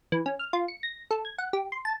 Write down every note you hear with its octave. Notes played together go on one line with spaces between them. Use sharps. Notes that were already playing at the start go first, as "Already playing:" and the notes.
E3
C#4
F6
F4
C#7
A#6
A4
G#6
F#5
G4
C6
A5